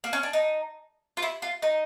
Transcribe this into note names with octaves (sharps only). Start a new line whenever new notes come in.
A#3
C#4
D4
D#4
F4
E4
F4
D#4